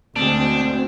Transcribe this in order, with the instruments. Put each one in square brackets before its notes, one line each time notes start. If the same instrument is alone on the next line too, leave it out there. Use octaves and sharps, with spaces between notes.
[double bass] D2 [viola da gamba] B2 G#3 [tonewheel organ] C4 [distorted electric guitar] D4